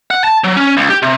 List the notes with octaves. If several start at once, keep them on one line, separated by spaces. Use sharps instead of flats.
F#5
A5
F#3
C#4
C#2
G4
C3